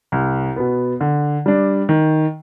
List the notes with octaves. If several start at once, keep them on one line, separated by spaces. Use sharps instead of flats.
C2
B2 B3
D3
G3 D4
D#3